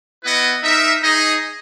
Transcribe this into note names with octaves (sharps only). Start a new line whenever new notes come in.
B3 E4 B4 D#5 F#5
D#4 A#4 E5
D#4 G#4 D#5